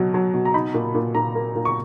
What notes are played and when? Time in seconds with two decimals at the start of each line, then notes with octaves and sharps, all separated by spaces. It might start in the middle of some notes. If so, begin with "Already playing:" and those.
Already playing: B2 F#3
0.14 F#3
0.34 B2
0.45 A#5
0.54 D#4 B5
0.74 A#2
0.95 A#2
1.15 A#2 A#5
1.35 A#3
1.55 A#2
1.65 C#6